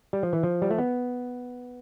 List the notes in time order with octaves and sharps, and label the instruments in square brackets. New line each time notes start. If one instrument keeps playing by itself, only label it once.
[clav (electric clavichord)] G3
F3
E3
F3
G3
A3
B3